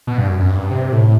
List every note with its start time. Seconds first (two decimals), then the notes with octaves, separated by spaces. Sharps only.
0.07 B2
0.18 G2
0.29 F#2
0.39 F#2
0.50 G2
0.71 C3
0.93 A2